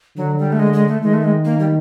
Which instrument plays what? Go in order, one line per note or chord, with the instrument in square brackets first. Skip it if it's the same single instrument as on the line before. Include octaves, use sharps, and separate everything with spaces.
[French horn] D3 [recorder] F#3
[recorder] G3
A3
G#3
G#3
A3
[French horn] D#3 [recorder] G#3
[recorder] A3
G#3
A#3
G3